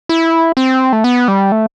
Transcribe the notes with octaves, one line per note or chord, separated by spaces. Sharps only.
E4
C4
A3
B3
G3
A3